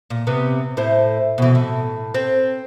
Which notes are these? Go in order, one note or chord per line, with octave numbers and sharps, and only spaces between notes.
A#2
C3 G3 B3
A2 E4 C5
B2 E3
A2
C4